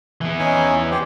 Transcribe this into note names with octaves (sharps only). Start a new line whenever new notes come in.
E3 B3
C#4 D#4 G#5
G4 C5 D5